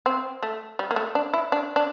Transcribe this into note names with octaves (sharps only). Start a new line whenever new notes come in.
C4
A3
G3
A#3
A3
D4
E4
D4
D4